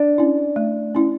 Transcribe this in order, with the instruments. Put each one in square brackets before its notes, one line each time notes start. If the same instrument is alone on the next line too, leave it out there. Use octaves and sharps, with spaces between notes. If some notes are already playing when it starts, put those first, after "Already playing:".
Already playing: [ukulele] D4
[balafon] C#4 E4
A3
C#4 E4